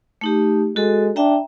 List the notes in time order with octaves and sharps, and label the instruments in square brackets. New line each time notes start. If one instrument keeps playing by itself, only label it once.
[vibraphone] A3 D#4 G4
[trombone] G#3 [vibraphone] F#4 A4
[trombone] D4 [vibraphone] E5 G5 A#5